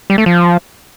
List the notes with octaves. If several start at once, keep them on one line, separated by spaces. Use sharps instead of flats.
G3
A3
F3